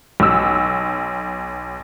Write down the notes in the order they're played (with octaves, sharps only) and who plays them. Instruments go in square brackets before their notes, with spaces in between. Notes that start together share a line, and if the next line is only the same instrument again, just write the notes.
[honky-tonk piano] B1 E6